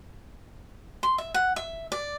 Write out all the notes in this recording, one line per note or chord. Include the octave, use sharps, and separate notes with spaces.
C6
E5
F#5
E5
D5